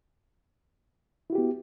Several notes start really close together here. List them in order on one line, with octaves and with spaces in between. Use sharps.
E4 F#4 G4 B3